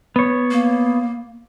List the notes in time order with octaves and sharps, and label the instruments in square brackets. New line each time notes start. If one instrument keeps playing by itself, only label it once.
[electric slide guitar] B3 C#5
[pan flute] A#3